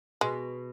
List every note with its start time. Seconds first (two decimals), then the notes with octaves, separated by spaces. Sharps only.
0.21 B2 G#3